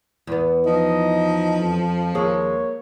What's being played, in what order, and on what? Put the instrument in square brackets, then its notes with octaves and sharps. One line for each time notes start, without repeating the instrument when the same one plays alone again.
[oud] E2 B3
[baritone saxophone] F3 [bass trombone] D#4 [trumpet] D#5
[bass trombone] F2
[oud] D#2 G#3 [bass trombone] A#3 [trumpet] C#5